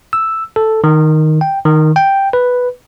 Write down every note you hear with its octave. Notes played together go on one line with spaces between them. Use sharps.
E6
A4
D#3
G5
D#3
G5
B4